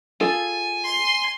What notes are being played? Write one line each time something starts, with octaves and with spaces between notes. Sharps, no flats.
F4 G#4 A4 G#5
C6